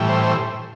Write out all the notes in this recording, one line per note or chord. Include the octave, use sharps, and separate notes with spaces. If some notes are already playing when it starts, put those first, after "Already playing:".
Already playing: A2 E3 G3
C5
C5